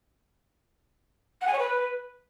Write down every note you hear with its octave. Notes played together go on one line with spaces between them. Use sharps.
F#5
G#5
C#5
B4